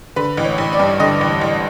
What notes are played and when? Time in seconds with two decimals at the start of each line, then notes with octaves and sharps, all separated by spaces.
0.16 D3 B4
0.37 A1
0.44 C#5
0.58 A1
0.73 D5
0.79 G2
1.00 D3 D#5
1.21 A1
1.41 A1